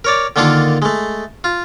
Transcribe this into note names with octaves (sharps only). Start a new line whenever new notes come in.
A#4 C#5 D5
D3 D#3 A#3 D4 F4 A4
G#3 A3
F4